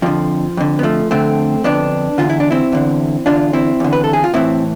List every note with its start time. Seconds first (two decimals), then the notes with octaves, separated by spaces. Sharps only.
0.02 F2 D3 F3
0.57 F2 D3
0.79 B3
0.83 F3 A3
1.11 F2 D3 A3 C4
1.64 F2 D3 B3 D4
2.18 E2 D3 F4
2.29 E4
2.40 D4
2.51 C4 E4
2.72 E2 D3
3.26 E2 D3 D4 F4
3.53 C4 E4
3.80 E2 D3
3.93 B4
4.04 A4
4.13 G#4
4.24 F4
4.34 A2 E3 C4 E4